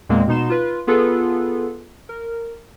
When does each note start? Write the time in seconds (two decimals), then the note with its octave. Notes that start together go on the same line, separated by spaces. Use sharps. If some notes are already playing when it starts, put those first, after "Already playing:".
0.09 E2 A#2 G#3 A#3 C4
0.27 B2 B3 D#4 C6 E7
0.50 F4 B4
0.87 B3 F4 G#4 A4 B4
2.09 A#4